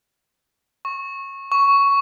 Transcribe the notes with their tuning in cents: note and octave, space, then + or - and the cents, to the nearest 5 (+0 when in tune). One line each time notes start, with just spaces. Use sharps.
C#6 -15
C#6 +10